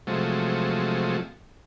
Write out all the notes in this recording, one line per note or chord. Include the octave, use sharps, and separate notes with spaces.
C3 F3 F#3 G#3 A3